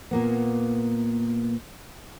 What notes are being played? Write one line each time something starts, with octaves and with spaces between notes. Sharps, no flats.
A#2 A#3 B3